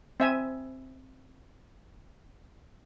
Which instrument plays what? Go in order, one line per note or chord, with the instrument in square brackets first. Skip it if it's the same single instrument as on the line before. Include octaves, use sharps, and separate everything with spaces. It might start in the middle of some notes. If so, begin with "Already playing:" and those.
[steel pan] C4 E5 G#5